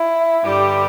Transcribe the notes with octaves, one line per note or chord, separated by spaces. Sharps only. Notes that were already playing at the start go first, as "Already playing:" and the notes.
Already playing: E4
G2 D3 G3 G4